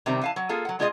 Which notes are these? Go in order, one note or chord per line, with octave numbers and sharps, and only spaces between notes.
C3 D#3 G3 C4
E3 F5 A5
F#3
A#3 F4 G#4 A4
F#3 F#5
B2 G#3 F4 G#4 C#5 D#5